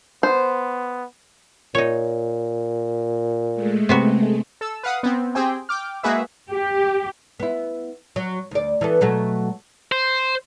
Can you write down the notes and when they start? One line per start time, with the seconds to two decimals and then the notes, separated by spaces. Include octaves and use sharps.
0.23 B3 C5
1.75 A#2 D#4 C#5
3.54 G#3 A3
3.89 C3 B3 F#4
4.61 A4 E6
4.83 B4 F5 F#5 D#6
5.03 B3 C4
5.35 C4 G4 G#4 C5 G5
5.69 G5 D6 F6
6.03 G#3 A#3 F#4 G#4 B4 E5
6.51 G4
7.40 B3 E4
8.16 F#3
8.51 D2 D5
8.81 E3 B3 A4
9.01 B2 F#3 A3
9.92 C5